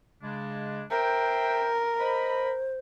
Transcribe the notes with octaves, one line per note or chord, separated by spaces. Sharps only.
C#3 G#3 D4
A#4 C5 E5 G5
C5 D#5 B5